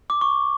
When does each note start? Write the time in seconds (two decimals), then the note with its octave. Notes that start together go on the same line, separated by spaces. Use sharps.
0.10 D6
0.21 C#6